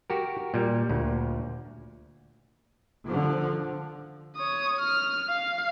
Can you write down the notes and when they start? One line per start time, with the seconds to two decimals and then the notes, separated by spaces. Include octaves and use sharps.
0.10 F#4 G4 A#4
0.54 A#2 G3
0.89 D2 A#2
3.07 D3 F3
4.36 C#5 D#6
4.80 F6
5.29 F5